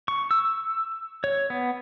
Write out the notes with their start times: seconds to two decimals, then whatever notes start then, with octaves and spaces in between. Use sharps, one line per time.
0.08 C#6
0.31 E6
1.24 C#5
1.50 B3